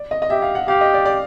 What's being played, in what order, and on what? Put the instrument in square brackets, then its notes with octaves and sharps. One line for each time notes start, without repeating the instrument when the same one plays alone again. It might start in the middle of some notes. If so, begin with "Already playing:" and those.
Already playing: [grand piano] D5
D#5
D#5
[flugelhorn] G4 [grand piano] E5
[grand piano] F5
F#5
[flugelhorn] G4 [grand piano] F5
[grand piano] D#5
D5
D5